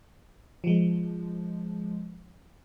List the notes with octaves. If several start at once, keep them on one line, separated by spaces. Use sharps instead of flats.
F3 G#3